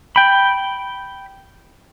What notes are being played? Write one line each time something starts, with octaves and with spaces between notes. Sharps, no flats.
G5 B5